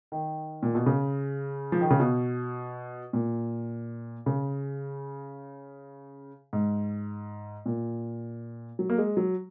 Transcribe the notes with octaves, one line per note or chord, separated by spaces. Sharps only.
D#3
A#2
B2
C#3
F3
D#3
C#3
B2
A#2
C#3
G#2
A#2
F#3
A#3
G#3
F#3